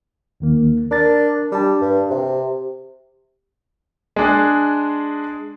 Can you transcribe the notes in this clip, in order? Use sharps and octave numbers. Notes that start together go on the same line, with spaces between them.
D#2 D#3 A#3
D4 A#4 A6
G3 D4 A5
G2
C3 G4
G#3 D4 G#4